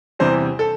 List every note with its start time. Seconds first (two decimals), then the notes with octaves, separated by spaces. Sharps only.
0.19 E2 C3 E3 G3 C5
0.59 A4